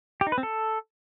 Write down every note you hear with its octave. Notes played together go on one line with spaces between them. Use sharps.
G4
D#4
B4
C4
A4